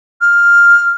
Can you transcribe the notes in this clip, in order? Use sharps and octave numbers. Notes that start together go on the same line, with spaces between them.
F6